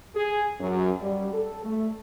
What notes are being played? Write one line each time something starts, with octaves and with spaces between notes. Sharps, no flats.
G#4
F#2
G3
A4
A3